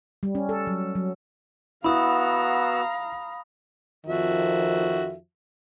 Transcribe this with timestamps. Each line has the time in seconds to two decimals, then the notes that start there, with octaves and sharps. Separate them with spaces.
0.23 G3
0.35 C#4
0.49 A4
0.67 F#3
0.95 F#3
1.84 B3 E4 F#4 F5 A#5 B5 D#6 E6
4.06 F2 D#3 F3 F#4 E5